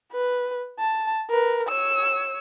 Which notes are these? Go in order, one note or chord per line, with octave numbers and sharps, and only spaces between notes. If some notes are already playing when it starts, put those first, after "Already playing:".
B4
A5
A#4 B4
C#5 E6